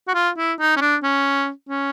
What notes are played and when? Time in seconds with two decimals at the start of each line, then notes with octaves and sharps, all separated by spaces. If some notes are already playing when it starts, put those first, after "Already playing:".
0.08 F#4
0.15 F4
0.38 E4
0.60 D#4
0.76 C#4
0.81 D4
1.03 C#4
1.70 C#4